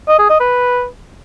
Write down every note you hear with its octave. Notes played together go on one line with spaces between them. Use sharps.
D#5
G#4
D#5
B4